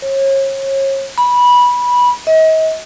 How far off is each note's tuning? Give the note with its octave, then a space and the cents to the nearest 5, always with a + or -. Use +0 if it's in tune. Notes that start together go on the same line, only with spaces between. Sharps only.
C#5 -35
B5 -15
D#5 +40